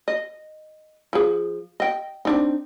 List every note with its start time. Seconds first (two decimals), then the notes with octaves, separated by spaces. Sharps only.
0.08 D#5
1.13 F3 G#4
1.80 D#5 G5
2.25 C4 D4 D#4